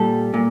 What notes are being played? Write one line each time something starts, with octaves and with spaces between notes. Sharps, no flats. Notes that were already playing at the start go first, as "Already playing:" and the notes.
Already playing: A#2 G3 A4
A#2